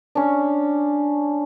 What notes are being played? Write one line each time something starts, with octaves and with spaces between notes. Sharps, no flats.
C#4 D4